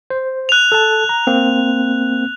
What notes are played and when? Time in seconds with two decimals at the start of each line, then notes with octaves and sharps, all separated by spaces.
0.10 C5
0.49 F#6 F7
0.72 A4 A5
1.09 A#5
1.27 A#3 C4